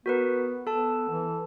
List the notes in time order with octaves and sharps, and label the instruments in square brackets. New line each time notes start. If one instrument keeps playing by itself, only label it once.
[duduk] B3 [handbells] F#4 A#4 B4
[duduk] B3 [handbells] A4 A5
[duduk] E3